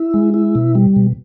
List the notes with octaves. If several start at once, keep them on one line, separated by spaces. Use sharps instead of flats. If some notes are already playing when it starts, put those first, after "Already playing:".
Already playing: E4
G#3
E4
B2
G3
B2